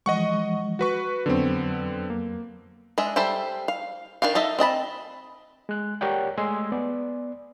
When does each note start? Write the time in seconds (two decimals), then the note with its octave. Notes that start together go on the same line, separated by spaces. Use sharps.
0.06 E3 F3 G#3 D#5 F#5 C#6
0.79 F#4 B4 C#6
1.26 F2 D3 F#3 B3 C4
2.10 A#3
2.98 G#3 D4 D#5 E5
3.16 G3 A4 C5 E5 G5
3.68 F5
4.22 D#3 D4 G4 F5
4.35 D#4 A4 D#5 E5
4.59 C4 D#5 A5 B5
5.69 G#3 F#6
6.01 G4 A#4 C#5 D5 F#5 G5
6.38 G#3 A3 D#5 G#5 C6 E6
6.72 B3 D5